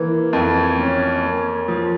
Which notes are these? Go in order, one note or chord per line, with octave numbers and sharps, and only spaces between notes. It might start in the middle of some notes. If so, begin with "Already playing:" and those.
Already playing: E3 A#3
F2
C#4
A#3
F3